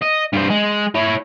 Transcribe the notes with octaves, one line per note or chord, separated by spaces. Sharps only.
D#5
G2 C5
G#3
E4 C#5